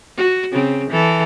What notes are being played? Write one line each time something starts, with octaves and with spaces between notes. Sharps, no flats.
F#4
C#3 C4
E3 A4